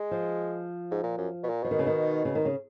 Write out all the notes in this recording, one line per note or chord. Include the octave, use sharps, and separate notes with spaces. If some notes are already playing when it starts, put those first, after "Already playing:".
Already playing: G#3
F3
G#2
A#2
F#2
B2
A#2
B2 F3
D#3
C#3
D#3
C#3
D#3
C#3